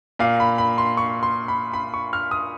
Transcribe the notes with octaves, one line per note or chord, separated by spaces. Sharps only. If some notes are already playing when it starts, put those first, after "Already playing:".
A#2 F5
B5
B5
C6
C#6
C6
B5
B5
C#6
F6
D#6